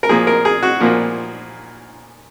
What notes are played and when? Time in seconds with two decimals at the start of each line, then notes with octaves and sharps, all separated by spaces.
0.03 A#4
0.09 A#2 F3 A#3 G#4
0.27 A#4
0.45 G#4
0.63 F#4
0.80 A#2 F3 A#3